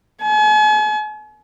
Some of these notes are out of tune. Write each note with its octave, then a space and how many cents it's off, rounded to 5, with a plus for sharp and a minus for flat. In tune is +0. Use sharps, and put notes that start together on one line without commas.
G#5 +40